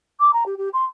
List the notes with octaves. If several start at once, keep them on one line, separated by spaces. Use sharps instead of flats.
D6
A#5
G4
G4
C6